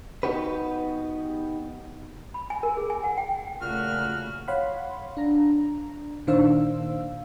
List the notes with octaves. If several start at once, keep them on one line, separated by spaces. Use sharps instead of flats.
B3 D#4 F#4 G4 B4
B5
G#5
A#4
G#4
G#5
F#5
G5
A#2 C#3 A3 F#4 F6
C#5 F5 F#5 B5 C6
D4 A#5
A#2 D#3 D4 C5 F5 E6